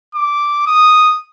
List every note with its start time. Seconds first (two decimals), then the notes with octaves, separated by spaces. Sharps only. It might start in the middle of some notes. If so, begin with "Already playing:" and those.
0.15 D6
0.67 D#6